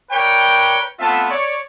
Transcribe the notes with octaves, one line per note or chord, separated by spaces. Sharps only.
A#4 B4 C#5 D5 G5
A3 B3 C4 F4 E5 A5
C#5 D5